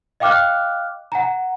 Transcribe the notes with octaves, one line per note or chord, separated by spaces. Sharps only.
D#5 F5 G5 D6 F6 F#6
F#5 G#5 A#5